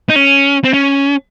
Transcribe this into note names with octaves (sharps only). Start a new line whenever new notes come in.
D#4
C#4
C4
C#4